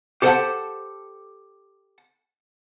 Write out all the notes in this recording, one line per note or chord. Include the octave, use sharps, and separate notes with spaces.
G4 A4 C5 E5 F#5 A5